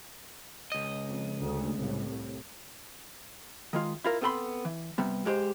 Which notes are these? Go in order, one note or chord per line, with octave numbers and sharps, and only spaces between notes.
C#2 D#5
F2
D2
C2 A2
D#3 G#3 F4
E4 F4 A#4
B3 C4 A4 G5 B5 C6
E3
C3 G3 B3
G#2 G#3 G4 C5